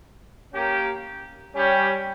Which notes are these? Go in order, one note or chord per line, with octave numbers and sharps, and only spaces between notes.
A#3 C#4 G4
G3 C#4 G4